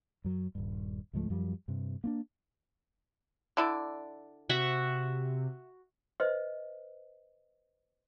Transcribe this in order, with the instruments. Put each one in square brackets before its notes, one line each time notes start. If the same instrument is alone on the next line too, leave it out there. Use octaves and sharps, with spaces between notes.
[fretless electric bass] F#2 F#3
D#1 G2
C#2 G#2 F3 A3
F#2 F3 G3
G2 C3
A#3 C4 D4
[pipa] D3 E4 D5
[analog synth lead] C3 [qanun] F#4 E5 F#5
[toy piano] B4 C5 D#5 E5